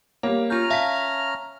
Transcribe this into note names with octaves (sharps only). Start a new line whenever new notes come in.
G3 A#3 C#5
C#4 F4 A#5 F6 G6
E5 F5 A5 A#6 B6